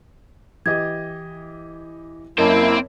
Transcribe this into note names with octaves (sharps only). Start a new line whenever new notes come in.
E3 G4 D#5 G#6
F#2 A#3 C4 E4 A#4 C5 D#5 A5